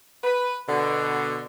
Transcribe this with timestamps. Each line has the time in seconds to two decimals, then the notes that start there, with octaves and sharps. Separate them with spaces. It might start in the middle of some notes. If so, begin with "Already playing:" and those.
0.24 B4
0.67 B2 D3